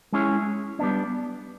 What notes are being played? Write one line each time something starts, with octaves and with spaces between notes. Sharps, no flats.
G#3 C#4 E4 G#4 C#5
G3 B3 D4